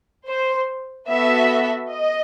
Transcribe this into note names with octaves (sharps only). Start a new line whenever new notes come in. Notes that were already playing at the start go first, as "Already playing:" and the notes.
C5
B3 F#4 A4 E5
D#5